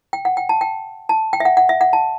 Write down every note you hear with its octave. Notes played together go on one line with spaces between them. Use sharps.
G5
F#5
G5
A5
G5
A5
G5
E5
F#5
F#5
E5
F#5
A5